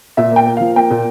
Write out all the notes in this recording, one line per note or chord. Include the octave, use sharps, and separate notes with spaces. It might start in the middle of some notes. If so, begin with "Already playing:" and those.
A#2 E5
A#3 G5
A#3
F3 F5
A#3 G5
A#2